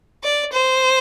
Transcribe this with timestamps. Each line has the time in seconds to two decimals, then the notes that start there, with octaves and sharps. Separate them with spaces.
0.23 D5
0.53 C5